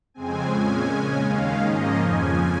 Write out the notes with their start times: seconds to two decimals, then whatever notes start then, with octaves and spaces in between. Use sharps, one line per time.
0.14 F2 C#3 G#3 C4 G#5
0.51 A#2 G#3 C#4
0.88 C#3 G#3 C#4
1.25 D#2 D#3 G#3 C#4 F5
1.62 G#2 F3 A#3 C#4 D#5
1.99 F2 C#3 F3 G#5